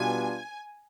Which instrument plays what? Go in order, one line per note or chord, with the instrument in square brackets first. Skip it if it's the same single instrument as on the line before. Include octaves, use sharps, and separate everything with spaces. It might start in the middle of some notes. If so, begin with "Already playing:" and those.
Already playing: [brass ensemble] B2 G3 B3 D4 F4 [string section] G#5